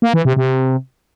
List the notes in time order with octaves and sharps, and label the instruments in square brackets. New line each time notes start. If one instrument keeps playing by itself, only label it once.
[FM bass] A#3
E3
C3
C3